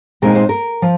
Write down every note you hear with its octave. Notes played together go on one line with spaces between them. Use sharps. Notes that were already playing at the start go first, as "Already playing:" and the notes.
A#2 G#3 C4 D#4 A#4
C5
A#4
F3